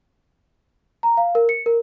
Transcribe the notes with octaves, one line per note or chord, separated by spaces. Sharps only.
A#5
F5
A#4
C#7
A#4